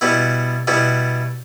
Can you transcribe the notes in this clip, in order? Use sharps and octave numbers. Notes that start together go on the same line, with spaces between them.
B2 G3 B3 E4
B2 G3 B3 E4